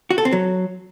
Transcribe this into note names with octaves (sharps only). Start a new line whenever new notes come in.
F#4
A4
C4
F#3